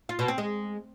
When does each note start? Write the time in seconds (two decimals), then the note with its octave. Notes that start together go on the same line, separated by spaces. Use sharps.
0.09 F4
0.19 B2
0.28 C4
0.38 G#3